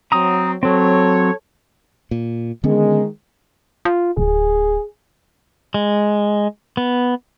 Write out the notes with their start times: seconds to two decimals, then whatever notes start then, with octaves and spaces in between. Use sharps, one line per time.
0.12 F#3 C4 A#5 D#6
0.63 F#3 C4 A4 C#5
2.11 A#2
2.64 D3 D#3 G#3 B3 C#4
3.85 F4
4.17 D1 G#4
5.74 G#3
6.77 B3